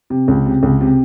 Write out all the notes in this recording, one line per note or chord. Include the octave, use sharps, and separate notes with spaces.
C3
C#2
C3
C#2
C3